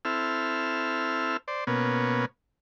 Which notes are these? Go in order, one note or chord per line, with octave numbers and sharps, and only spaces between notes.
C4 E4 A4 F6
C5 D5
B2 A#3 B3 C#4